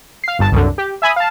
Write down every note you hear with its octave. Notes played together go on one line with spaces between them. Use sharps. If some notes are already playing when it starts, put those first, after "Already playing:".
F5 C7
G1 G2 A5
C2 F#2 D3
G4
E5 G#5 B5 D#6
F5 A5